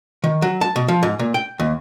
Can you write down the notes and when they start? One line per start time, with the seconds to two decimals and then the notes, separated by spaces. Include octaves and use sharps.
0.24 D#3
0.42 F#3
0.61 A5
0.76 B2
0.88 F3
1.03 G#2
1.19 A#2
1.34 G5
1.60 D#2